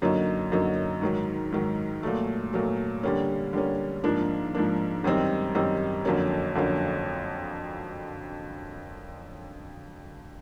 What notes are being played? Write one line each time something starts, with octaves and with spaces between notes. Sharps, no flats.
F#2 D3 F#3 A#3 D#4
F#2 D3 F#3 A#3 D#4
G#2 D#3 F#3
G#2 D#3 F#3
A#2 F#3 A3
A#2 F#3 A3
D3 G3 A#3 C#4
D3 G3 A#3 C#4
G#2 F3 A#3 D4
G#2 F3 A#3 D4
F#2 D#3 G3 C4 D#4
F#2 D#3 G3 C4 D#4
F2 D3 F#3 A#3 C#4
F2 D3 F#3 A#3 C#4